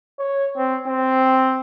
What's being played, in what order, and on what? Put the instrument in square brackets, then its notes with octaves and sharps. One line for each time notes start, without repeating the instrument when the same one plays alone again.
[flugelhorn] C#5
C4
C4